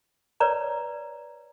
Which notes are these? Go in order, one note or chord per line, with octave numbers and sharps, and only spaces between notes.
B4 C#5 D5 A#5